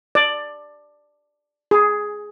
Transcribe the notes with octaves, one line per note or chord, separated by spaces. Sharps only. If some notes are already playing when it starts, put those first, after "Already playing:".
D5
G#4